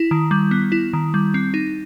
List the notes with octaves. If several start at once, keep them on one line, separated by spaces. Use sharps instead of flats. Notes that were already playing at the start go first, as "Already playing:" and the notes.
Already playing: E4
D#3
G3
B3
E4
D#3
G3
C4
D#4